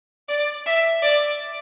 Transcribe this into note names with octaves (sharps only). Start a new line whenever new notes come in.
D5
E5
D5